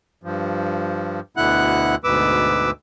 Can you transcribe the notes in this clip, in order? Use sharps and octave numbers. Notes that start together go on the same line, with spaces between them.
G2 F3
D2 B2 D3 E4 F#5 F#6
D2 G#2 B2 B4 D6 E6